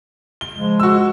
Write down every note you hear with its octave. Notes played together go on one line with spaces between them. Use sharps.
G7
C#3 F3 G#3
F#4 E6